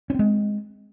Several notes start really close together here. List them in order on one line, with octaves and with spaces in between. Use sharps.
C#4 C4 G#3